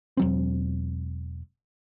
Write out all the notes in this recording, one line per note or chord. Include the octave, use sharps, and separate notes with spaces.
E1 F#3 C4